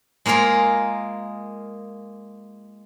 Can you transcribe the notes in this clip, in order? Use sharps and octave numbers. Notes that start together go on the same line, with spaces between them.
G#3 A#3 F4 G#4 A#4